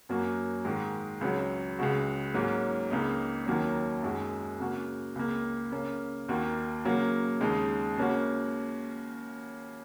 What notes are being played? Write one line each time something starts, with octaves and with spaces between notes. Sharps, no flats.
F#2 F#3 A#3 F#4
G#2 D#3 G#3
C#2 C#3 F#3
C#2 C#3 G#3 F#4
G#2 F#3 A#3 C#4
C#2 C#3 A#3 D#4
D#2 D#3 F#3 A#3 C#4
F#2 D#3 G#3 F#4
C#3 A#3 F#4
C#2 C#3 A#3
C#3 A#3 C#4
D#2 D#3 A#3 F#4
C#3 F#3 A#3
D#2 C#3 G#3 D#4
C#3 A#3 C#4 F#4